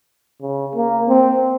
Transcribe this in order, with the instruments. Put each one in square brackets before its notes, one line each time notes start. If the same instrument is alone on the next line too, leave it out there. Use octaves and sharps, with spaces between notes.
[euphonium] C#3
A#3
C4